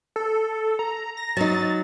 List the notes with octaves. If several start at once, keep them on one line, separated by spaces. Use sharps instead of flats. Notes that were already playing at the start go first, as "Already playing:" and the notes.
A4
A#5
A#6
F#3 D#4 A6